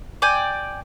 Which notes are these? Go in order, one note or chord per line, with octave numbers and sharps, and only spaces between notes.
D5 G5 G#5